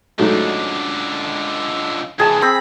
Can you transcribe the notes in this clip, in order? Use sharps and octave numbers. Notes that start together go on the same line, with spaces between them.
C#2 G#2 D3 F#3 A3
C3 E3 G#4 G#5 A5
C4 B5